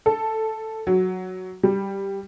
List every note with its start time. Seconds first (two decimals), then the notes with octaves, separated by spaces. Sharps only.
0.06 A4
0.87 F#3
1.63 G3